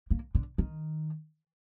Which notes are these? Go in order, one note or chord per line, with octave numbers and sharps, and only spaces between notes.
A#3
D3
D#3